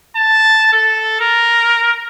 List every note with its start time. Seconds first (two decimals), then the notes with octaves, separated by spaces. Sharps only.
0.16 A5
0.73 A4
1.21 A#4